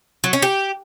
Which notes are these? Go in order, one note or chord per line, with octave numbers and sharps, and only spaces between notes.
F#3
C#4
G4